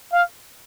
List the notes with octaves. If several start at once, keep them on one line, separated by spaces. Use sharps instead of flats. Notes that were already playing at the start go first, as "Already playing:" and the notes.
F5